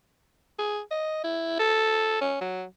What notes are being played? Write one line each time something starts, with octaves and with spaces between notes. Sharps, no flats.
G#4
D#5
E4
A4
C#4
F#3